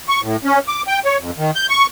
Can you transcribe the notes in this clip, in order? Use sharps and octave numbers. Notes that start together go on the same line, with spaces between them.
C#6
A2
C#4
D6
G5
C#5
F2
D#3
G6
C#6